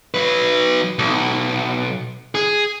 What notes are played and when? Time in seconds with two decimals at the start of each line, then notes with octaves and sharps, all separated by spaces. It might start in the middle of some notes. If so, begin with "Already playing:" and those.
0.14 F#3 B4
0.99 B1
2.35 G#4